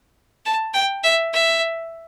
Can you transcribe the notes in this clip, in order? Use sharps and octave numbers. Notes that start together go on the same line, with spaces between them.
A5
G5
E5
E5